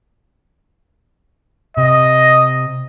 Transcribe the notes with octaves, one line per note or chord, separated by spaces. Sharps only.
C3 D#5